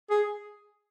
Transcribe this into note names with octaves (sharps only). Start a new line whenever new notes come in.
G#4